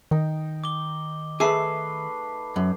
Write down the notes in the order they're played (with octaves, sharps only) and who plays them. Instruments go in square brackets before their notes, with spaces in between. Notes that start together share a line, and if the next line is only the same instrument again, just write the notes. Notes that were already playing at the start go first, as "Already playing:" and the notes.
[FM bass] D#3 [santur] D#4 G5
[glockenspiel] D6 G7
[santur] A3 B4 [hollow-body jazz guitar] G#4 E5 [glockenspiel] D6 C7
[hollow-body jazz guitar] F#2